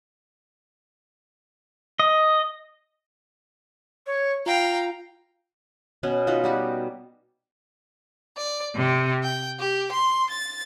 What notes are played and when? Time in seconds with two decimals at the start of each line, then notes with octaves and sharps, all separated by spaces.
1.99 D#5
4.06 C#5
4.46 F4 F5 G5 A#5
6.03 B2 B3 C#4
6.27 D#4 F4 F#4 B4
6.44 G3 F#4 G4
8.37 D5
8.75 C3
9.23 G5
9.58 G4
9.92 C6
10.29 A6